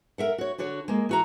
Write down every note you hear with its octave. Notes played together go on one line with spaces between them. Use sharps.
A#4 E5 F#5
F#4 C#5
D3 D4 F#4 C#5
G#3 A#3
E3 F#4 A#5